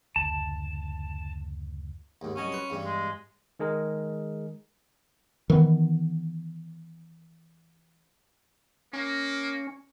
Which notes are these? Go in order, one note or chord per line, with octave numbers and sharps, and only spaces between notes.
F#1 D2 A5
D#2 G#2
C2 F#3 C#4 D#5
B4 C6
E2 G2 G3
G#3
D#3 G#3 G#4 A#4
D#3 E3 B3
A#3 C#4